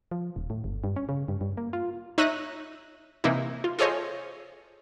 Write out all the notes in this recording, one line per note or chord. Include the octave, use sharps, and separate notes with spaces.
F3
D#1
A2
G1
G2
C#4
C#3
G2
G2
A#3
F4
D#4 C#5 E5 F#6 A#6 D#7
C3 E3 A#3 D#4 E4
F4
F4 G#4 A4 C5 C#5 D#5